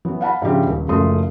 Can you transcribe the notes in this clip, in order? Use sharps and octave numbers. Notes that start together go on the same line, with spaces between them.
E3 F#3 B3
F5 F#5 A5 B5
G#2 C#3 F3 D4 E4 G4
D#1
F#1 C#3 F3 A3 C6 D#6